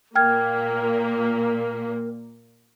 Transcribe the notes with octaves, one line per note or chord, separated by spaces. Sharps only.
A#2 A#3 A#4 G5 F6 G#6